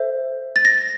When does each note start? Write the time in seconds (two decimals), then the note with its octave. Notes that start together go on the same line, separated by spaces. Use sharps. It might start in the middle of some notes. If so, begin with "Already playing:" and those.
Already playing: A4 C5 E5
0.56 A6
0.65 A#6